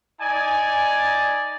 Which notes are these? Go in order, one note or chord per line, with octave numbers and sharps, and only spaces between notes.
D#4 D5 G#5